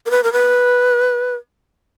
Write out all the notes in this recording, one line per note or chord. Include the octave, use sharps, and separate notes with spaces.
A#4
B4
A#4
B4